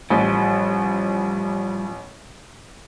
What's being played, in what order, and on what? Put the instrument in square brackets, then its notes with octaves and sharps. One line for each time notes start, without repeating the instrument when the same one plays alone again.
[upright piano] A1 [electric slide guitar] F3 G3